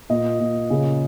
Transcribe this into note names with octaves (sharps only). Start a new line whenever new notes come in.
A#2 D#5
A#2
C#3